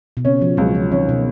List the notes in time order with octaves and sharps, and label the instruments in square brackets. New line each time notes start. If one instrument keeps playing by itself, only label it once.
[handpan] B2
[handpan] C#3 [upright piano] C#4
[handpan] F3
[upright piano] C#2 [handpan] F#3
[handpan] F3
[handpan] D#3 [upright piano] C#4
[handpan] B2